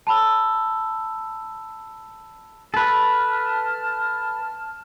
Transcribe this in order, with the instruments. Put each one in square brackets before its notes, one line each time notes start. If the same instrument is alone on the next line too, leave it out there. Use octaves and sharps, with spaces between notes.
[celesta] A5 B5 E6
[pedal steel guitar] A4 B4 [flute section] A5 F6